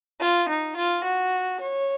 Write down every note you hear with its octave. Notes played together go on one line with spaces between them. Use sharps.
F4
D#4
F4
F#4
C#5